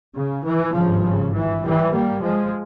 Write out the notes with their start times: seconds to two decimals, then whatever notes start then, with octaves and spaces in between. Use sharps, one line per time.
0.16 C#3
0.45 E3
0.74 G#1 G2 C#3 F3
1.04 C#3
1.34 E3
1.63 E3 G3
1.93 G3 A#3
2.22 F3 G#3